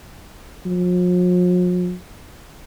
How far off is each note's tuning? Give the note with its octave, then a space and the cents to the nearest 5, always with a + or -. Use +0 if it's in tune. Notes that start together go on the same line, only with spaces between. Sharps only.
F3 +45